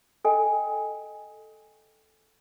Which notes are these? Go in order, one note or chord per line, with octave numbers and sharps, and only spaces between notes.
A4 D#5 G5 G#5